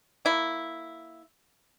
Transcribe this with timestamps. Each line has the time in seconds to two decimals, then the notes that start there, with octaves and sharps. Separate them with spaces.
0.25 A#3 E4